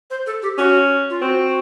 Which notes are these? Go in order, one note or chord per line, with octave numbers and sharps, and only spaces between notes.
C5
A4
G4
C#4 F#4
F4
C4 F#4